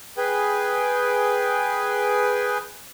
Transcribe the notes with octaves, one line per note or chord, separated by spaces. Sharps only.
G#4 B4 G5